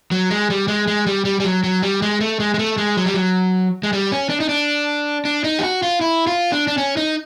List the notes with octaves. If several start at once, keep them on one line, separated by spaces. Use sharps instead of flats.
F#3
G#3
G3
G#3
G#3
G3
G3
G3
F#3
F#3
G3
G#3
A3
G#3
G#3
A3
G#3
F#3
G3
F#3
G#3
G3
C#4
D4
D#4
D4
D4
D#4
G4
F#4
F4
E4
F4
D4
D4
C#4
D#4